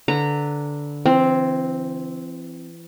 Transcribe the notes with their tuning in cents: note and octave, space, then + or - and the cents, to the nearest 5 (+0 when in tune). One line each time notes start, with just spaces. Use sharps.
D3 -10 B4 +5 A#5 -20
E3 +35 C4 +0